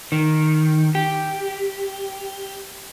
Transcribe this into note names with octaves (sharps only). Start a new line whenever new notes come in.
D#3
G4